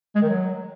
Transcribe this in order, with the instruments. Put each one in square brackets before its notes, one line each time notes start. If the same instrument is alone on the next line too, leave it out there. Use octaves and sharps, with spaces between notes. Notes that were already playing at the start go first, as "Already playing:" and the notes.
[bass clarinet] G#3
D#3
F#3